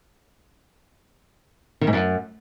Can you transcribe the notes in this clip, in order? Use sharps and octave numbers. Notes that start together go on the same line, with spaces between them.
D#3
G#2
F#2